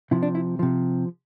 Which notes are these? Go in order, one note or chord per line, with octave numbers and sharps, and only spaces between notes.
C3 F3 E4
D4
E4
C3 F3